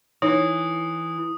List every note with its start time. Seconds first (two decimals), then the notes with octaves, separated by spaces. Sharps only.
0.22 E3 D#4 C#5 D#6